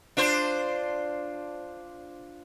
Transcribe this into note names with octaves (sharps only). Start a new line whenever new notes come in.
D4 F4 C5